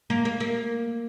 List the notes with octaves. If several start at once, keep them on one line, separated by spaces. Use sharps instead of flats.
A#3
A#3
A#3